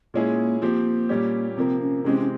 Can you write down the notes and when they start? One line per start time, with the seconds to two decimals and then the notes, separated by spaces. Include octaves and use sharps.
0.14 A#2 G#3 A#3 C4 C#4 E4 G#4
0.61 F3 A#3 C4 G4
1.09 A#2 G3 C#4 G4
1.57 C3 F3 A#3 C4
1.80 C#4
2.04 C3 E3 G#3 C4 C#4 G4
2.20 C#4